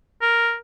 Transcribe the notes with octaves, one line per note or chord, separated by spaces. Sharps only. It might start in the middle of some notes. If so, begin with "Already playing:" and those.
A#4